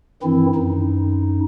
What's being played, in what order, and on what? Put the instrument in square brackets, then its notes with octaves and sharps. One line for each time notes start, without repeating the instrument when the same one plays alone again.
[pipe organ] G2 D#3 E3 C4 E4
F#2 D#4